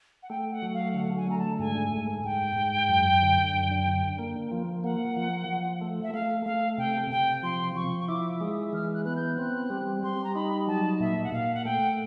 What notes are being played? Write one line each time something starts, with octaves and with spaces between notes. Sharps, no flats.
F#5
A3 G5
F#5
F#3
F5
D3 F#5
G#5
A3 A#5
A5
G#2 G#5
G#2 G#5
G#2 G5
G#2
F#2
D3
F#2
D3
A#3
F3
A#3 F#5
F3
F3
A3
E5
A3 F5
A3 F5
C3 G5
C3 G5
F3 C6
F3 C#6
C#6
E4 D6
G#3 D#6
E3 F6
F#6
B3 F#6
G6
C4 F#6
G3
G3 C6
A#5
D#4 B5
F#3 A5
A#2 E5
F#5
A#2 F5
F#5
A3 G5